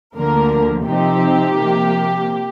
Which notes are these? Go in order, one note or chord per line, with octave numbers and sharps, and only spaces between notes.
D2 D3 F3 A#3 A#4
C3 F3 C4 D#4 G4
C3 F3 A#3